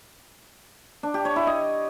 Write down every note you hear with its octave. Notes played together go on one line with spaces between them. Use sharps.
D4
G4
C#5
E4
D#5